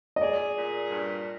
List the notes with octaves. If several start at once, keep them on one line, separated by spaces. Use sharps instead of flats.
D#5
G#4 D5
A#2
G2